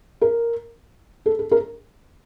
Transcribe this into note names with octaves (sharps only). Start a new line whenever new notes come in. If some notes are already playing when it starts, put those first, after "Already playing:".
A#4
A4
A4
A#4